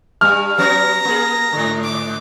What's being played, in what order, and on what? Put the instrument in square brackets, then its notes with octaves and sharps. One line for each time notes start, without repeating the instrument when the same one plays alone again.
[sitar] G2 G3 [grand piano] F6
[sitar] F#3 B3 C#4 [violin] A#5 A#6
[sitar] A#3 G#4
G#2 D3
[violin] D6